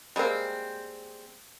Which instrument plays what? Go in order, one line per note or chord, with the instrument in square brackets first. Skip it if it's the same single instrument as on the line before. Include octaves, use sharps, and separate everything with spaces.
[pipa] G3 G#3 A#3 C4